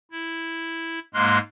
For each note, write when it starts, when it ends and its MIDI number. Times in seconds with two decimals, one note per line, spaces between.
0.11 0.99 64
1.14 1.38 44
1.14 1.38 56
1.14 1.38 58
1.14 1.38 84
1.14 1.38 89
1.14 1.38 90